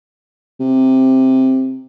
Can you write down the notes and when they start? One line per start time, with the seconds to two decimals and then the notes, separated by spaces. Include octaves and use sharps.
0.60 C3